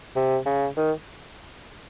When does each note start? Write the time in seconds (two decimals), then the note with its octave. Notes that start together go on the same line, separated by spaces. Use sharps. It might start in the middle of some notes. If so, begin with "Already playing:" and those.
0.16 C3
0.46 C#3
0.77 D#3